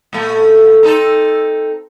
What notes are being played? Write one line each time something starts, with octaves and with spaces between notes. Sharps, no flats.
A#2 A3
C4 D#4 A4